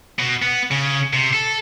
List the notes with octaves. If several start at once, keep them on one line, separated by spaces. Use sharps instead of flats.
B2
B3
C#3
C3
A4